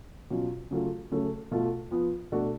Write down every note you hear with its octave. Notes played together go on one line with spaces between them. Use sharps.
B2 F#3 C#4 F4
C#3 F#3 A3 F4
C#3 F#3 A3 C#4
B2 A3 F4
F3 B3 F4
B2 A3 D4 F#4